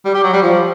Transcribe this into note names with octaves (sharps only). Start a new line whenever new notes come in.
G3
G4
F#3
G3
F3